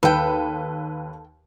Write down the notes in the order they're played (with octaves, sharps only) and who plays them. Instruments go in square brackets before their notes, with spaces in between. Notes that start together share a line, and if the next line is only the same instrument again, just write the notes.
[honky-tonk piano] D#2 B4 [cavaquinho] A4 G5